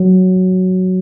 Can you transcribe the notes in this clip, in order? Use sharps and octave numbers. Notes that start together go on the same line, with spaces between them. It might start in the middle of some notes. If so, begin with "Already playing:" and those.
Already playing: F#3